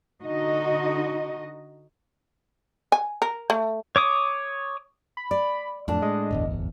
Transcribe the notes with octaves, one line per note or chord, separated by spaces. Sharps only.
D3 D#4 F#4 D#5
G#5
A#4
A3
C#5 D6 D#6
B5
D5
F2 A2 D4 A5
G#3 D#5
D1 G1 E2